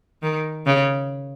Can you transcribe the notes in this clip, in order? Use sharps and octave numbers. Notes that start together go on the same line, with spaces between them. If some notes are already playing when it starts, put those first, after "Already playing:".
D#3
C#3